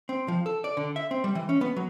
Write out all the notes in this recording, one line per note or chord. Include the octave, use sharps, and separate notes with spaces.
C4
F3
A4
D5
D3
E5
C4
G3
E3
C#4
B3
F#3